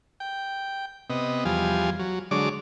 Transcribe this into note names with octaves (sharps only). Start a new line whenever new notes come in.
G5
C3 B3 D#5
E2 F3 G3 F5 G#5
F#3
D3 F#3 G#3 C#5 D5 D6